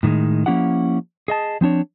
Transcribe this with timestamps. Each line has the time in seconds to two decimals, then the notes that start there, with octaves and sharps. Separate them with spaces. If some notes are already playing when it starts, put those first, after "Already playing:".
0.03 A2 D#3 G3 G#3
0.46 F3 A#3 C#4 E4 G4 F#5
1.28 G#4 D#5 A5
1.61 F3 C4 D4 C#5